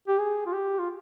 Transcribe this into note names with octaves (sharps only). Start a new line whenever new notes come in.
G4
G#4
F4
G4
F4